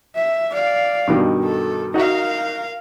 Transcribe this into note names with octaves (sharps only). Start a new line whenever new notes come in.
E5
D5 F5
G2 B2 D#3
A4
D#4 F#4 A#4 F5